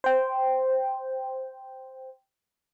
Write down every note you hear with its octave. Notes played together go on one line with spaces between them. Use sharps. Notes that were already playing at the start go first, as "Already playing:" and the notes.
C5 G5